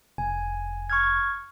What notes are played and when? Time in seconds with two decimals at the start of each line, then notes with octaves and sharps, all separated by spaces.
0.18 F1 G#5
0.90 C#6 F6 G#6